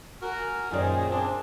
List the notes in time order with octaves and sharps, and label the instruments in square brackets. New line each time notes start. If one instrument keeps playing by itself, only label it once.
[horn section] F#4 A#4 [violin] G#5
[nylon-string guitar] F#2 D5 [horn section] A#2 D#3 [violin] G#4 C5
[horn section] C4 D4